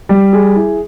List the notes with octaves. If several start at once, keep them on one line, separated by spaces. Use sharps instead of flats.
G3
G#4
E4